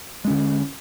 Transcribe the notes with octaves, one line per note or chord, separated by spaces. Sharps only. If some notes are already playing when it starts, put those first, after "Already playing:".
D3 G#3 C#4